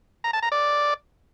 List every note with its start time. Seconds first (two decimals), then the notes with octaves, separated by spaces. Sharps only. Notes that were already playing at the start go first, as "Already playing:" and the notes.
0.24 A#5
0.33 A5
0.42 A#5
0.52 D5